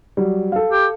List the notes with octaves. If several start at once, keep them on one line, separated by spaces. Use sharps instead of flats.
F#3 G3
A4 F5
G4